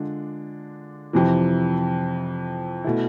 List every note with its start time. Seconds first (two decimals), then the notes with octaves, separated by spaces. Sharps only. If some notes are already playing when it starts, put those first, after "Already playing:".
Already playing: D3 G#3 D4 F4
1.13 F2 C3 E3
2.84 B2 A3 E4